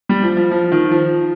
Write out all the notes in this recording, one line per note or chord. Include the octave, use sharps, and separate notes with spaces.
G3
F3
F3
F3
D#3
F3